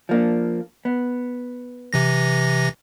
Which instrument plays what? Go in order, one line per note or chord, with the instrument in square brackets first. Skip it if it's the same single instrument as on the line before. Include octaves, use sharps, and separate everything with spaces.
[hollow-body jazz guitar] F3 A#3 D4
B3
[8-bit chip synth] C3 E3 A#6